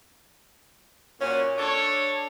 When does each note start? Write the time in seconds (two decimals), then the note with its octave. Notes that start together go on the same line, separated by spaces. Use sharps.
1.20 A#2 C#4 F#4 G#5
1.58 D4 A4 C#5